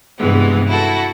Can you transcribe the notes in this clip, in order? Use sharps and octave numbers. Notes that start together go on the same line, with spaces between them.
G2 C3 E3 G#3 B3
E4 F#4 A4